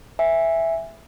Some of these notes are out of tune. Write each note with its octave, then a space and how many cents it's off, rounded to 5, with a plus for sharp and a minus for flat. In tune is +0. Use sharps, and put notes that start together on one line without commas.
E5 +0 G#5 -20